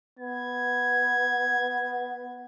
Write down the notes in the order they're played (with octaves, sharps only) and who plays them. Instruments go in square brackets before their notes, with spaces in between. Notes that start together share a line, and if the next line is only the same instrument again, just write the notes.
[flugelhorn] B3 [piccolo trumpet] G#6